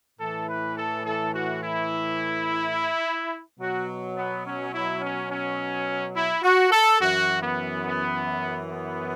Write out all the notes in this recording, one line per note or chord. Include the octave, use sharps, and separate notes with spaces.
A2 E3 A4
B4
A4
A4
F#4
E4
B2 F#3 F#4
B3
C#4
E4
C#4
C#4
E4
F#4
A4
F#2 E3 F#4
B3
B3
B3